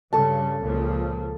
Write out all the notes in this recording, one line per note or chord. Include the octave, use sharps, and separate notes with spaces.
G2 C#3 A4 A5
C#2 A#2 F3